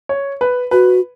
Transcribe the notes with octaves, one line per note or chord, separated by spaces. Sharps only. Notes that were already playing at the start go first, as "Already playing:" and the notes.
C#5
B4
F#4 B4